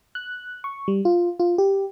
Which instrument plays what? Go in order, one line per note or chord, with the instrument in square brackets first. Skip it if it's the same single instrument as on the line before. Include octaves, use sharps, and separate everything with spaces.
[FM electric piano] F#6
C#6
G3
F4
F4
G4